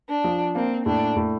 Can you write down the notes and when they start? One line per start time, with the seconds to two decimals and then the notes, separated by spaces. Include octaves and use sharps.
0.09 D4
0.24 F3
0.55 A#3 C4
0.85 A2 D4
1.16 A2